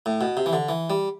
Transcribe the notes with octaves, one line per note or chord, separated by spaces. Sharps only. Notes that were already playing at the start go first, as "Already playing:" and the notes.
A2
B2
C3
E3
D3
E3
G3